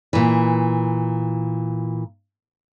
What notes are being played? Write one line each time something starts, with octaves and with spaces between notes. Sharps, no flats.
A#2 E3